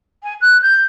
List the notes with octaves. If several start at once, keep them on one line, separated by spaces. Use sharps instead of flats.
G#5
F#6
G6